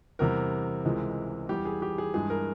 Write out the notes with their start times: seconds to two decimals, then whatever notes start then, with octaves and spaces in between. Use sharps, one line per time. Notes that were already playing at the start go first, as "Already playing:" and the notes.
0.19 E2 C3 G3 A#4
0.85 C#2 C3 E3 G#3
1.49 E2 E3 G3 G4
1.65 G#4
1.82 G4
1.98 G#4
2.14 G2 E3 G#3 G#4
2.30 A#4